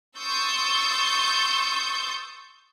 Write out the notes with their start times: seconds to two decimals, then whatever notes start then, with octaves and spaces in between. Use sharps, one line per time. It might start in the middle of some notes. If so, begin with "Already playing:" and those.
0.18 C6 C#6 D#6 E6 G6 A6